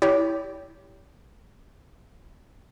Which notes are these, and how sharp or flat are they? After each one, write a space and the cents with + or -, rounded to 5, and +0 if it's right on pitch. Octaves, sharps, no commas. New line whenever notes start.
E4 -10 G4 +0 C#5 +35